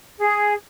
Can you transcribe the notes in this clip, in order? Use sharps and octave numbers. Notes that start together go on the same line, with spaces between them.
G#4